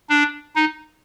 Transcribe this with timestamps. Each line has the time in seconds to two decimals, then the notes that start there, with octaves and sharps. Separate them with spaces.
0.10 D4
0.56 D#4